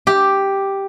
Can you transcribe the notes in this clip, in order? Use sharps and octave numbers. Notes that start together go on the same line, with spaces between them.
G4